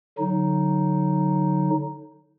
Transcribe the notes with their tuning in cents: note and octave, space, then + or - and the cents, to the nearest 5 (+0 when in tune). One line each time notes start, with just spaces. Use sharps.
D3 +0 F#3 +0 D#4 +0